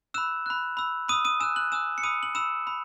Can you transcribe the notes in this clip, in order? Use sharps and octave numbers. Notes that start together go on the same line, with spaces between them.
B5 E6 F#6 E7
B5 F#6
B5 E6
B5 D#6 E6 D#7
D#6 D#7
G#5 D#6 E6 F#6 E7
F#6 F#7
G#5 D#6 E6 F#6 E7
C#7
B5 D#6 E6 D#7
F#7
B5 E6 E7
B5